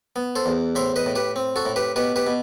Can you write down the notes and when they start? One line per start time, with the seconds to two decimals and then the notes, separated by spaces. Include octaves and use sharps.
0.16 B3
0.36 A4 C5
0.46 E2
0.75 A2 C5 E5
0.96 B4 D#5
1.06 A2
1.16 G4 B4
1.36 C4
1.56 F#4 A4
1.66 A2
1.76 G4 B4
1.96 B2 G4 B4
2.16 G4 B4
2.27 B2